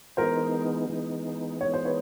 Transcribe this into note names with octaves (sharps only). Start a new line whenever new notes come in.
E3 G#3 B3 D#4 A#4 C5
E3 G#3 B3 D#4
E3 G#3 B3 D#4 C#5
C5
B4 C#5